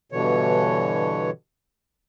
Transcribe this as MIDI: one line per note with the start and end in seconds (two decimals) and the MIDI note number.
0.12 1.30 43
0.12 1.30 47
0.12 1.30 50
0.12 1.30 52
0.12 1.30 73